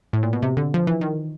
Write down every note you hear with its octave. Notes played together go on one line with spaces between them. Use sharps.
A2
A#2
B2
C3
D3
F3
E3
D#3